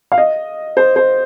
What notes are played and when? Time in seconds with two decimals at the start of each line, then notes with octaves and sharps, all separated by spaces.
0.12 F5
0.18 D#5
0.77 C5
0.96 C5